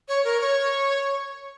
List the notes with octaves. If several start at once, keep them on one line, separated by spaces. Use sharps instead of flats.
C#5
A#4
C#5